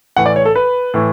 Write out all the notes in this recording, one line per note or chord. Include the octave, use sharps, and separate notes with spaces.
A2 E3 F#5
D5
C#5
A4
B4
A2 E3